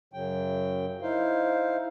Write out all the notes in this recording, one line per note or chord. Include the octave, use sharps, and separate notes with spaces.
F#2 C#3 F#3 G5
D#4 E4 C5 F5